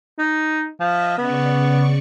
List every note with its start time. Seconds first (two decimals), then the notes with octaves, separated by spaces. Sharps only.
0.19 D#4
0.80 F3 D#5 E5
1.18 C#3 B3 D5 C#6